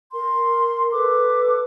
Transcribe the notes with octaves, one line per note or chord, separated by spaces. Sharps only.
A#4 C6
A4 B4 D6